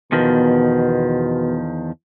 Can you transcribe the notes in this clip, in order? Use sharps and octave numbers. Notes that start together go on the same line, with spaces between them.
E2 B2 D#3 F3